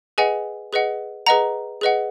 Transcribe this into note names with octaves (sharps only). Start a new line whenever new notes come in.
G#4 B4 D#5 F#5 G#5
G#4 B4 D#5 F#5
G#4 B4 D#5 F#5 A#5
G#4 B4 D#5 F#5